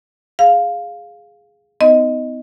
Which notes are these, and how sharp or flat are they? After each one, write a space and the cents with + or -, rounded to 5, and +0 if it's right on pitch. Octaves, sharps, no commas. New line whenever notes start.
G#4 +0 F5 +5
B3 +40 D#4 +25 D#5 +0